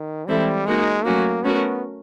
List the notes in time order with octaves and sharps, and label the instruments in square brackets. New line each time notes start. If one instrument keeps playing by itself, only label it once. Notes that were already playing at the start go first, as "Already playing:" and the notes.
Already playing: [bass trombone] D#3
[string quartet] E3 G#3 C4 E4 A4 [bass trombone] G3
[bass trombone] G#3 [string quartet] A#3 D#4 F#4 A#4
[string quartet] F#3 A3 C#4 F#4 [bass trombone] A#3
[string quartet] A3 C#4 F#4 A#4 [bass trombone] B3